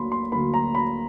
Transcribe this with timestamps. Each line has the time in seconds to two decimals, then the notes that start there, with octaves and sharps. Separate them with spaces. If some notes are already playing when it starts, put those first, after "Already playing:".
Already playing: D2 D3 F#3 A#3 B5 C6
0.12 C6
0.32 D2 D3 F#3 A#3 B5
0.54 A#5
0.75 B5